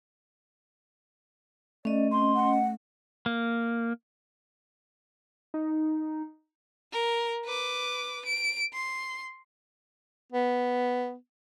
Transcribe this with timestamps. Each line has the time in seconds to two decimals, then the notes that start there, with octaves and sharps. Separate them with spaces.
1.85 A3 C#4 D5 D#5
2.12 C4 C6
2.33 F#5
3.26 A#3
5.54 D#4
6.92 A#4
7.45 B4 D6
8.26 D7
8.74 C6
10.32 B3